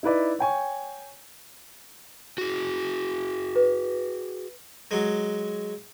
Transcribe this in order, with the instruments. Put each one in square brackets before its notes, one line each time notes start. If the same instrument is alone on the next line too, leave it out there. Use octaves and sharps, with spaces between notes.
[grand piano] D#4 E4 B4 D5
C#5 G5 G#5 C#6
[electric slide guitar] F#4 G#4
[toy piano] B4
[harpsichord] F#3 G#3